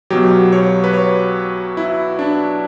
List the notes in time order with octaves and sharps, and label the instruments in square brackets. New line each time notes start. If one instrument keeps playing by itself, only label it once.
[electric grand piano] B1 B2 F#3 G4
C#5
B4
C#5
E4
D4